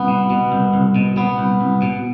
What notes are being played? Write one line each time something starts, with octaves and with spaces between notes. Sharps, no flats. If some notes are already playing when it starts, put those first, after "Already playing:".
Already playing: C2 B3
B2
B2
C2
C2
B2
B2 B3
C2
C2
B2